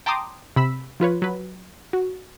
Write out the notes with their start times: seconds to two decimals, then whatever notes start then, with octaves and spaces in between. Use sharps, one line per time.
0.06 G5 A5 A#5 C6 D6 D#6
0.56 C3 B5 E6 B6
1.00 F3 F4 B4 C#5
1.22 F#3 B4
1.93 F#4